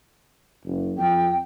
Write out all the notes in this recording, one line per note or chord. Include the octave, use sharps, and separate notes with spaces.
F#1
F2 G5